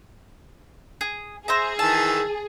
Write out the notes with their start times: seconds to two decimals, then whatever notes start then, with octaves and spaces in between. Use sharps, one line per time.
1.01 G#4
1.48 G#4 C5 E5 A#5
1.79 D#3 E3 A5 E6